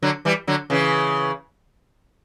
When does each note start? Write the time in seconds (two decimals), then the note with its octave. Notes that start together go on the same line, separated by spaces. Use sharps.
0.02 D3 F#3
0.25 E3 G3
0.47 D3 F#3
0.70 C#3 E3